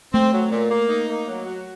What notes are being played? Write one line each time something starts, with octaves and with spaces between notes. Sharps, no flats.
A3 C4
F#3
A#2
A#3
D#4
A#3
F#3
F#4